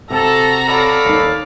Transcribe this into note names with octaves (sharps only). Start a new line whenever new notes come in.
C3 F#4 A4 A#5
A4 C#5 D5 F5 B5
D#2 D#4